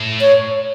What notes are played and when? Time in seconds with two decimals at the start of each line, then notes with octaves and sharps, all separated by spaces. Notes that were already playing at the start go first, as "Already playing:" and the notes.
Already playing: A2
0.21 C#5